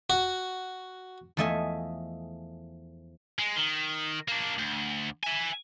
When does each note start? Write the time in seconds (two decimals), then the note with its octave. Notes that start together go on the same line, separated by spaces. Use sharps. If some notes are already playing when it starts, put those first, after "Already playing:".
0.10 F#4
1.37 E2 F3 A3 D#5 E5 G#5
3.39 G#3
3.56 D#3
4.28 A#3 D4
4.59 D2
5.23 E5 G#5